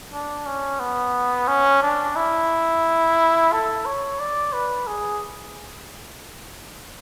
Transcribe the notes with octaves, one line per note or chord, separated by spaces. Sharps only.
D4
C#4
B3
C#4
D4
E4
A4
C#5
D5
B4
G#4